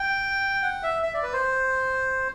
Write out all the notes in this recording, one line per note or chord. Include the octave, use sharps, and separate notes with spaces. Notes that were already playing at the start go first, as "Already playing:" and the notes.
Already playing: G5
F#5
E5
E5
D5
B4
C5